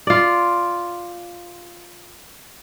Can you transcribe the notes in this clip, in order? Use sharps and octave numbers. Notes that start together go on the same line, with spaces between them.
F4 D5